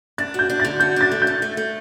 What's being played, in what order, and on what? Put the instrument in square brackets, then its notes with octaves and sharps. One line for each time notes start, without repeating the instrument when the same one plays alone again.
[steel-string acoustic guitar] D4 [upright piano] A6
[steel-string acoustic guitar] F#4 [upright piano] G6
[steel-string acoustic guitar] D4
[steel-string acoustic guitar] D3 [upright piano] A6
[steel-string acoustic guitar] F#4 [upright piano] G6
[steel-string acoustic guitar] D4 [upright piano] A6
[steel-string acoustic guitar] A3
[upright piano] G6
[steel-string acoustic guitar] A3
A3
A3